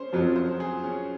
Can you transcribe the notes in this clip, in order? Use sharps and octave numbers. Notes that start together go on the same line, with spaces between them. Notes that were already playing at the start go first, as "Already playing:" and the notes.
Already playing: C#4 G#4 C5
F2 F3 F#3
C5
G#4
C#4